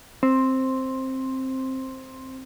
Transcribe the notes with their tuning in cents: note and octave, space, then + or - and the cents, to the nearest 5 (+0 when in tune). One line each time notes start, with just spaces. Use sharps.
C4 +5